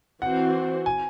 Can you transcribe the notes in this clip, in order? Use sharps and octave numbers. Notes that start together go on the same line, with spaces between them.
E3 C4 F#4 C5 F#5
G#5